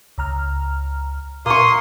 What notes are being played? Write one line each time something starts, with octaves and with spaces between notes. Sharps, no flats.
C#2 A#5 F6
A#2 A#3 C6 C#6 D#6